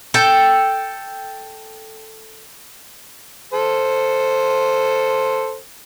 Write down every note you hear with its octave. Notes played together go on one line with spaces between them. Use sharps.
A4 G5
A4 C5